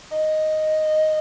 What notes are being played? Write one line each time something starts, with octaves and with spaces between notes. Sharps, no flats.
D#5